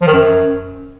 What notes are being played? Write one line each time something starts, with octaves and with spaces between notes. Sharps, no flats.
F3
D#3
F#2